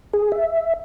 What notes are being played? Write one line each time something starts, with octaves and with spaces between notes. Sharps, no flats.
G#4
E5